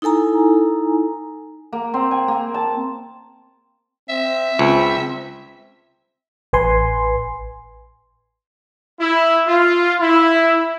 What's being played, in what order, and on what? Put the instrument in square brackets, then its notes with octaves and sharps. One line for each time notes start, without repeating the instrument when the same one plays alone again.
[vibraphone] D#4 E4 A4 G#5 A#5
[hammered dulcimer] A#3
C4
G#5
A#3
A5
[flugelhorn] C4 [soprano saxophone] E5
[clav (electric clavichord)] C#2 [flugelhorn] C4
[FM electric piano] A1 B4 G#5 C6
[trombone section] E4
F4
E4